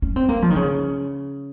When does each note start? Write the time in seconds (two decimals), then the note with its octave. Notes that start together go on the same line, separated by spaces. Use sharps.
0.02 C#4
0.16 C4
0.29 A#3
0.42 F3
0.50 D#3
0.56 C#3